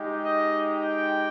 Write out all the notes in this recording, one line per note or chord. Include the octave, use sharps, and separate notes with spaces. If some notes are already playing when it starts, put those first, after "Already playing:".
Already playing: G#3 D#4 G4
D#5
G5